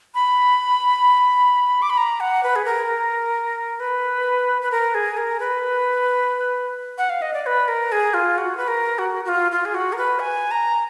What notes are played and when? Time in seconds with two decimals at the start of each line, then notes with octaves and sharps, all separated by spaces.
0.14 B5
1.82 D6
1.90 B5
1.97 A#5
2.20 F#5
2.43 B4
2.56 G#4
2.65 A#4
3.80 B4
4.62 B4
4.71 A#4
4.94 G#4
5.17 A#4
5.40 B4
6.98 F#5
7.10 F5
7.22 D#5
7.34 D5
7.46 B4
7.68 A#4
7.92 G#4
8.14 F4
8.38 F#4
8.57 B4
8.68 A#4
8.99 F#4
9.25 F#4
9.28 F4
9.52 F4
9.65 G#4
9.74 F#4
9.93 A#4
9.98 B4
10.20 G#5
10.51 A#5